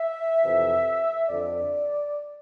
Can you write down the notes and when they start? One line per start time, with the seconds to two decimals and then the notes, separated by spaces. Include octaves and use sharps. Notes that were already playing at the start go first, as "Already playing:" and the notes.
Already playing: E5
0.44 F2 C3 E3
1.29 F2 D3 D5